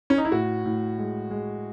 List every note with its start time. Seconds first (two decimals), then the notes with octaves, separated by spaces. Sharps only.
0.10 C#4
0.18 D#4
0.25 E4
0.32 A2 F#4
0.65 A2
0.98 G#3
1.31 G#3